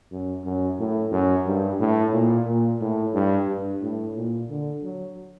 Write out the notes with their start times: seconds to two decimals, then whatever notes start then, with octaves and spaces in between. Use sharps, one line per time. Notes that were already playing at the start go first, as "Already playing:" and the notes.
0.11 F#2
0.45 F#2
0.79 A2
1.12 F#2
1.46 G2
1.80 A2
2.13 A#2
2.47 A#2
2.81 A2
3.14 G2
3.48 G2
3.82 A2
4.16 A#2
4.50 D3
4.83 F#3